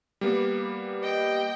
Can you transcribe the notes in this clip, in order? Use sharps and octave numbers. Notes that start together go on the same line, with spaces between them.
G3 A#3 B3
D#5 G5